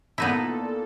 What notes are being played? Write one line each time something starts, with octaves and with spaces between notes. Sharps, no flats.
A#2 B3 D#4 E4 A4